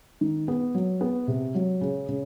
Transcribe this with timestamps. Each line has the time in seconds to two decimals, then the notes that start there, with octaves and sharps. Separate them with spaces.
0.21 D#3
0.48 B3
0.75 F#3
1.01 B3
1.28 C3
1.55 F#3
1.81 C#3
2.09 C#3